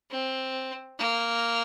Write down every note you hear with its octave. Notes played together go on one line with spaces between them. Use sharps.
C4
A#3